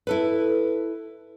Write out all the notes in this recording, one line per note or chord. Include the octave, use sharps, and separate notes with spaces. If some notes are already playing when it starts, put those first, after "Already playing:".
E4 A4 B4